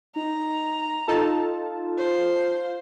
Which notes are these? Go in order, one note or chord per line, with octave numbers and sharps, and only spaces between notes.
D#4 A#5
D#4 F4 A4 A5
C5